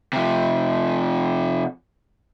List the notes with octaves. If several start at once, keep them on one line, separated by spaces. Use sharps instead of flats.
C3 F3